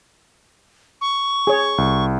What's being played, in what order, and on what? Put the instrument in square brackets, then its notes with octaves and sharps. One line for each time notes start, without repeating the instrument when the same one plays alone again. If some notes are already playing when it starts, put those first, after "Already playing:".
[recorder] C#6
[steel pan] G#4 C#5
[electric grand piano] C2